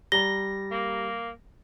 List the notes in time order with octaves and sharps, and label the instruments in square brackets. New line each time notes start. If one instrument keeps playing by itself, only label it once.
[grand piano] G3 A#5 A6 [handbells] A#6 [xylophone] G7
[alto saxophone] A#3